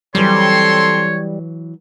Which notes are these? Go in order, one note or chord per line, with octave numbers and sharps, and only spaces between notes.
E3 F#3 G3 C4 A4 C#5 C6